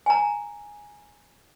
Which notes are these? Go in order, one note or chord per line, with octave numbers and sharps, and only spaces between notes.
G#5 A#5